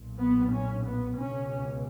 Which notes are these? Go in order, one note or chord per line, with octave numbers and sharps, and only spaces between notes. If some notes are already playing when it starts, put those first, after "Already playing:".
Already playing: B1 A#2
B3
C#4
B3
C#2 B2 C#4